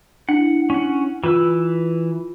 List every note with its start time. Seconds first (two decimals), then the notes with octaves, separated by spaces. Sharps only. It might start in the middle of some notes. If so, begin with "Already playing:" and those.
0.29 D4 E4 F#5
0.70 C#4 F#5
1.24 E3 F4 B4 E6